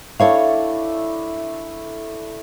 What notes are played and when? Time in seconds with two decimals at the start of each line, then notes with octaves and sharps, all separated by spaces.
0.19 A3 D4 E4 A4 C#5 F5